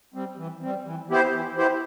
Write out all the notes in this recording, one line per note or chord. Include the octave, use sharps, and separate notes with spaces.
G3 C4
E3
G3 C4
E3
B3 E4 G4 C5
E3
B3 E4 G4 C5